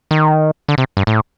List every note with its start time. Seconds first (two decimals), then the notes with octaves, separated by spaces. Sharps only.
0.11 D#3
0.68 D3
0.78 C3
0.97 G2
1.07 A2